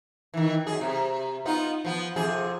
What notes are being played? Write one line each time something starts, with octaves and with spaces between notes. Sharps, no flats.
D#3 E3
F#2 G#4
C3
B3 D#4 F4
F3 B3
F2 C3 G#4